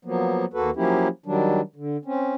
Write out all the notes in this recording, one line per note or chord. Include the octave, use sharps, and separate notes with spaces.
F3 F#3 A#3 B3
D#2 A#3 F#4 A4 B4
F3 F#3 A#3 C#4 E4 G4
D#3 F#3 G3 D4
D3
C4 C#4